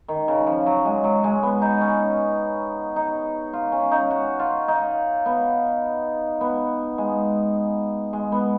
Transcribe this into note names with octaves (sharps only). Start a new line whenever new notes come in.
D#3
C#3
F3
F#3
G#3
F#3
G#3
B3
D#4
C#4
D#4
F4
C#4
D#4
F#4
F4
D#4
B3
B3
G#3
G#3
B3